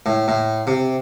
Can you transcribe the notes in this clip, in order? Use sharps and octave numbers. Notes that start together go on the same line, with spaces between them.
A2
A2
C3